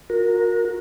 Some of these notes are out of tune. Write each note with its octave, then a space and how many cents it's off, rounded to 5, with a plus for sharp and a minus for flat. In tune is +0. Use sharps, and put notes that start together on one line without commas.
F#4 -40 A#4 -5